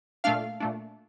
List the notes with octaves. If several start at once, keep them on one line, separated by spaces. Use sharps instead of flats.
A#2 A3 D4 F5
A#2 A3 D4